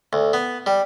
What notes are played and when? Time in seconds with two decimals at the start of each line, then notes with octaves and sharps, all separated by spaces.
0.13 D2
0.33 B3
0.66 G3